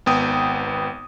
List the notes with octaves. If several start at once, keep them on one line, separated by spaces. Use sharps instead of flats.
G#1 B3 G5 D#6